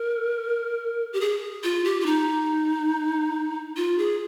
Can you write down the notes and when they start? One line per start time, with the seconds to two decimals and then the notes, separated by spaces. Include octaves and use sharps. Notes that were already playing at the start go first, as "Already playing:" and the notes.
Already playing: A#4
1.13 G4
1.21 G#4
1.64 F4
1.85 G4
2.00 F4
2.06 D#4
3.77 F4
3.98 G#4